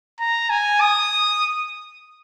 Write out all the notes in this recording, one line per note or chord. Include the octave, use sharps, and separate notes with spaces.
A#5
G#5
D#6